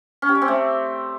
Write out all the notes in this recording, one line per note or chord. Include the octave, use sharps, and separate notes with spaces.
C#4
G4
D5
C4
A3